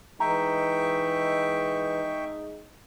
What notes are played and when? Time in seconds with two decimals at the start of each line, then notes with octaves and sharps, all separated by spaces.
0.20 E3 G#3 D#4 E5 G5 A#5 C#6